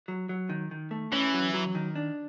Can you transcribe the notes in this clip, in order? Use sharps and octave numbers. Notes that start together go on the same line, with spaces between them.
F#3
F#3
D#3
D#3
A3
E3 C#4
F#3
F#3
D#3
D4